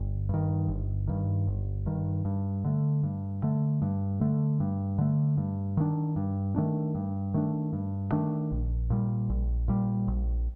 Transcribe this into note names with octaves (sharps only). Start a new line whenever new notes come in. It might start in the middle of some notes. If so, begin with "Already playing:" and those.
Already playing: G1
G2 D#3
G1
G2 D#3
G1
G2 D#3
G2
D3 A3
G2
D3 A3
G2
D3 A3
G2
D3 A3
G2
D#3 A3 D4
G2
D#3 A3 D4
G2
D#3 A3 D4
G2
D#3 A3 D4
A#1
A#2 G3
A#1
A#2 G3
A#1